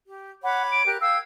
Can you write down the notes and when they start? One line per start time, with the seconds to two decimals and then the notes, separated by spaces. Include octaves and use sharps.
0.07 G4
0.44 C#5 F#5 B5 D6
0.72 D7
0.86 G4 A#4 F#6
1.01 F5 G5 E6 G#6